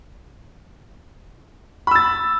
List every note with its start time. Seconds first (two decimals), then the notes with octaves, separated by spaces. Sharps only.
1.87 B5
1.91 E6
1.95 A6